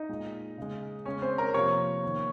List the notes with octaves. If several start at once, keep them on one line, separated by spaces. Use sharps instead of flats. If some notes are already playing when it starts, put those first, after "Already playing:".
Already playing: D#4 D#5
A#2 G#3
C#3 G#3
C#3 G#3 C#4 C#5
C4 C5
A#4 A#5
C3 F3 A#3 C#5 C#6
D#3 A#3